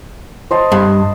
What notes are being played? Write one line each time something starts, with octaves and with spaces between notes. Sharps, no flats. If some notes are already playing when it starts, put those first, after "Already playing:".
C5 D#5 A5
G2